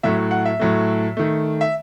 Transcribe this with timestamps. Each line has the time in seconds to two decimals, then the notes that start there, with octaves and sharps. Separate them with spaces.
0.03 A2 F#3 A3 E5
0.31 F#5
0.45 E5
0.59 A2 F#3 A3
1.17 D#3 A3
1.61 E5